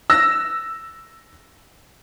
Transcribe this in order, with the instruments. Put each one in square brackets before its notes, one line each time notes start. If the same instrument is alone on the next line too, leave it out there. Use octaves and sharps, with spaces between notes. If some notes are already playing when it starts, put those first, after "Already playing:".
[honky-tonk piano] E6 A#6